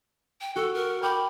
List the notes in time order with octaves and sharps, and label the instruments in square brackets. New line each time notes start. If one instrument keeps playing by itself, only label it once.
[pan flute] G5
[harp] F#4 [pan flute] A4
[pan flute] A#4
[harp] G5 D6 G6 [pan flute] B5